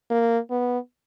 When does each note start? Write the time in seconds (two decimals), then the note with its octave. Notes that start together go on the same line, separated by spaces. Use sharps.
0.11 A#3
0.50 B3